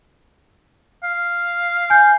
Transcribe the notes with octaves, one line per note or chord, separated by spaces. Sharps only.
F5
G#5 G6